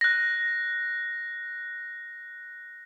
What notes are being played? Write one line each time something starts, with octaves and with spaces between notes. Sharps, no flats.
F#6 A#6